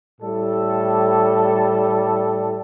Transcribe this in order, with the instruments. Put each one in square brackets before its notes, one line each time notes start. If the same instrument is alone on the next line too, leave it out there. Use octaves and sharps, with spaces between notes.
[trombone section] A2 G3 A4